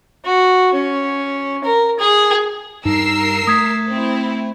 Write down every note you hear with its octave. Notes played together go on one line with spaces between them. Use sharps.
F#4
C#4
A#4
G#4
G2 G3 D#4 A#4 E6 C7
A3 D#6 G#6 B6
C4 E4